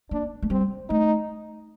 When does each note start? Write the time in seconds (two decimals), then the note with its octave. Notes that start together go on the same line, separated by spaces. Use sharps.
0.11 A#3 D4
0.42 A3
0.50 G3 C4
0.89 A3 D#4